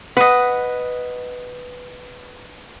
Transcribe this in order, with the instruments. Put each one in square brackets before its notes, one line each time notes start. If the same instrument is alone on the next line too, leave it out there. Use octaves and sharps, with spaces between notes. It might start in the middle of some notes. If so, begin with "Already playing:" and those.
[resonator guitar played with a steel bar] B4 [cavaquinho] D#5 F#5